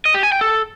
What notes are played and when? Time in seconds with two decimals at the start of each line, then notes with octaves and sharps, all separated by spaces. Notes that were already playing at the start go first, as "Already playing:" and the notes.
0.05 D#5
0.14 G4
0.23 G#5
0.32 G5
0.41 A4